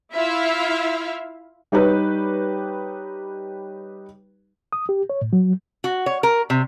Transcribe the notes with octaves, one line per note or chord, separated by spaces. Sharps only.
E4 F4 E5 F5
G3 D#4 G4 B4 C#5
D#6
G4
C#5
A2
F#3
F#4
C#5
A#4
C3